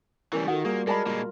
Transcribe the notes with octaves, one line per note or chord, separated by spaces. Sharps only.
E3 G3 C#4 A#4
D#3 F4 F#4 A4 A#4 F#5
G3 A#3 G#4 C5
G#3 A#4 D5 A5 B5
A#2 G#3 F4